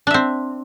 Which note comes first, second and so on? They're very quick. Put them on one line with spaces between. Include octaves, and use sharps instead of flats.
D4 E5 C4